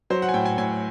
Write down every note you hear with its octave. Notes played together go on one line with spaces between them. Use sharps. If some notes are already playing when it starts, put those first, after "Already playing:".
F#3 C5
F#5
G#5
A2 G5
G#5
A2 G#5